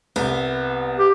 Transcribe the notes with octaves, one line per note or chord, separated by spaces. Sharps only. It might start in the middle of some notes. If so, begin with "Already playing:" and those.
C2 B3
G4